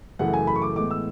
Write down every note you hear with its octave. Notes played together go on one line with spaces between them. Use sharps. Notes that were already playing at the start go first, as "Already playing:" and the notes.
F#2 C#3 E3 A3 F#5
G#5
B5
C#6
D6
A2 E3 G#3 B3 D6
E6